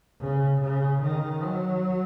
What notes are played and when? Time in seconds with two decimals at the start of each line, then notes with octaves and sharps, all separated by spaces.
0.20 C#3
0.61 C#3
1.02 D#3
1.43 F#3